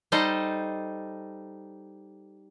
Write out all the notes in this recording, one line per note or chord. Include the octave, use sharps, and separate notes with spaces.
G3 D#4 A4 C5 D#5